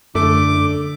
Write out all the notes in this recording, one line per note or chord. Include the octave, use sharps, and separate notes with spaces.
F#2 D3 A3 D6